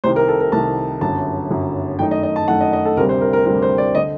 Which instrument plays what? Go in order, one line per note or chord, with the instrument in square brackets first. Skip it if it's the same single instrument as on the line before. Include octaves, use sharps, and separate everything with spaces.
[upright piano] C2 C3 D#3 C5
A#4
A4
A#4
C2 C3 D#3 A5
G1 F#2 F#3 A5
G1 F#2 F#3
F#2 D#3 A3 D#4 G5
D#5
D#5
A5
F#2 D#3 A3 D#4 F#5
D#5
D#5
A4
D2 C3 G3 C4 A#4
C5
A#4
A#4
D2 C3 G3 C4 A#4
C5
D5
D3 D#5